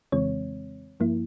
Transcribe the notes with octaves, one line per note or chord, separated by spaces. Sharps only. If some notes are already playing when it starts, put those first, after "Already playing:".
F2 C#3 E3 G#3 C4 C#5
G2 F3 A#3 E4